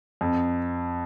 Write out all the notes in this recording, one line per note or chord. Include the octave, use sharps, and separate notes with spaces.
F2